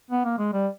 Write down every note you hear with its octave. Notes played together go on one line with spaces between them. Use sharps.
B3
A#3
G#3
G3